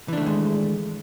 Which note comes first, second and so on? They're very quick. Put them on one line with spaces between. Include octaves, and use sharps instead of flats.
E3 D4 A3 D#3 G#3